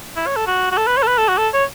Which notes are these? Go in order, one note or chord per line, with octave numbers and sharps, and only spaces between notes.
E4
C#5
A4
F#4
F#4
A4
B4
C#5
A4
B4
A4
F#4
A4
C#5